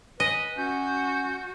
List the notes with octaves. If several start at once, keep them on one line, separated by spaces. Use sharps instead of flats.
B4 D#5 G#5
C#4 F#4 G6